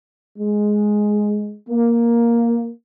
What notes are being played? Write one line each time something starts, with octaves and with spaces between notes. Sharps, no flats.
G#3
A#3